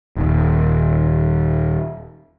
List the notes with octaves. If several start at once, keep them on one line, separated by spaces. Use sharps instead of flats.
D#1 D#2